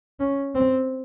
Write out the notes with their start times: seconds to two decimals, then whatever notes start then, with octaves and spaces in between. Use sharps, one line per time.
0.20 C#4
0.55 C4